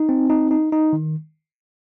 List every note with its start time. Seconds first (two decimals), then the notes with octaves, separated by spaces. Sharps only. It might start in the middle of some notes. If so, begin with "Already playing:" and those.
Already playing: D#4
0.09 C4
0.30 D#4
0.51 D#4
0.72 D#4
0.93 D#3